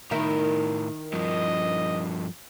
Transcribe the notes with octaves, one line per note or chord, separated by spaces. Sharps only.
A2 D#3 E4 A#4
G2 F3 D#5